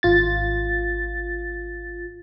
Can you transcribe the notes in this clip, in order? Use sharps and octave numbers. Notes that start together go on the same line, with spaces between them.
G#1 F4 A6